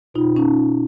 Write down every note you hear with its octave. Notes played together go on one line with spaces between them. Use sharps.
B2 D#4 F4
C#4 D#4